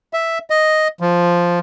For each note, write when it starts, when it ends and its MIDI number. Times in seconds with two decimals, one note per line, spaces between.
0.13 0.39 76
0.50 0.88 75
1.00 1.59 53